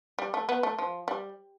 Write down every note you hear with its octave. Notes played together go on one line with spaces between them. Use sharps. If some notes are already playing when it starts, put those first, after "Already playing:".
G3
A3
B3
A3
F3
G3